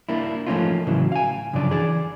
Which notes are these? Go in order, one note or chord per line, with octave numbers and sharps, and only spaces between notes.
A#3 D4 E4
F3 A3 A#3 C#4 D#4 F4
A2 C#3 E3 F#3 E4
F5 G#5
F#2 C#3 F3 D4 D5
E3 G#4 D5